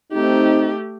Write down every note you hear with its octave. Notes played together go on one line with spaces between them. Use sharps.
A3 C4 D#4 G4